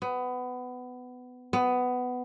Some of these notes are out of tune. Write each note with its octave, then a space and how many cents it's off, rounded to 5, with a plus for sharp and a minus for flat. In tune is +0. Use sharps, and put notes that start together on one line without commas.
B3 +20
B3 +15